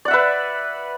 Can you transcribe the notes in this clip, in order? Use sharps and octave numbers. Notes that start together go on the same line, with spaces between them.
B4 D5 E5 F#5